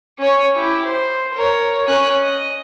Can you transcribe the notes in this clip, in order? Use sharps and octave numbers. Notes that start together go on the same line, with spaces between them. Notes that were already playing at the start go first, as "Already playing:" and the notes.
C#4 C#5
E4 G4
C5
A#4 C#5
C#4 F#6
D#5